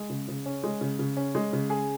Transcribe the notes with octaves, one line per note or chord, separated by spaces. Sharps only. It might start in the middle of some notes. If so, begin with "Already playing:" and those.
Already playing: G#3
C#3
C#3
C#4
G#3
C#3
C#3
C#4
G#3
C#3
G#4